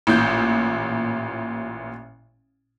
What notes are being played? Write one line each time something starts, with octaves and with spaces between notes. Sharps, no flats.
A1 A#2 G6